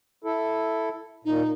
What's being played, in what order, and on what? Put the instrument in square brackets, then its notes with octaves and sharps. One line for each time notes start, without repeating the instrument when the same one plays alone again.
[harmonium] E4 A4
[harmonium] A#2 [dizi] D#4